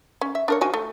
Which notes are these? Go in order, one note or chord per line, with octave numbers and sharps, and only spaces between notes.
C#4
E5
D4 A#4 C#5
F3 F#4 G#5
A3